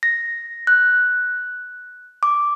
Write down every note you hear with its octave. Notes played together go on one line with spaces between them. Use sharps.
A#6
F#6
D6